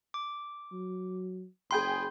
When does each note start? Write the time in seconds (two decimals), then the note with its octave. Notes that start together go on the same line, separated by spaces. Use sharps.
0.14 D6
0.72 F#3
1.71 F#1 G#4 G5 B5 C6 G6